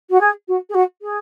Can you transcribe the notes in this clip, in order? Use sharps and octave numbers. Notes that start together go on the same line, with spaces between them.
F#4
G#4
F#4
G#4
F#4
G#4